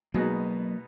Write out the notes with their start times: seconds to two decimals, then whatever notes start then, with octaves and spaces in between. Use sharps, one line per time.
0.14 B2 F#3 G#3 A#3 B3 D#4 F#4